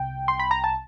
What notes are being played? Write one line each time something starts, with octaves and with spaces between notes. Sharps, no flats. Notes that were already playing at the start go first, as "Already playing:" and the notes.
Already playing: C2 C3 G5
C6
B5
A#5
A5